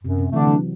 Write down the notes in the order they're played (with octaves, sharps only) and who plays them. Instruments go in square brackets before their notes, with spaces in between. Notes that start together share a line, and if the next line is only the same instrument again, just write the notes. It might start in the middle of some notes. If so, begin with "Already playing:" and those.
[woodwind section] F#2 [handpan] C3
[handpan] C3
[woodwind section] D3 A3 D4 [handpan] E3
[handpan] F#3